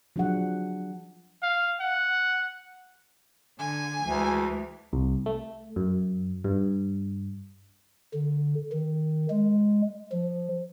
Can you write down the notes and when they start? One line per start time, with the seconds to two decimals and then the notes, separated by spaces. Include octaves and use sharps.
0.16 F3 F#3 D4 G#4 F#5
1.42 F5
1.80 F#5
3.59 D3 G#5
4.05 D2 E3 G#3
4.93 C2
5.26 A3
5.76 F#2
6.44 G2
8.14 D3
8.72 D#3
9.30 G#3
10.12 F3